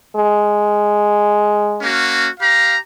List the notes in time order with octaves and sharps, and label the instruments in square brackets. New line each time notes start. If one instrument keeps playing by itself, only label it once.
[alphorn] G#3
[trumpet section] A#3 C#4 F#4
G4 F5 A#5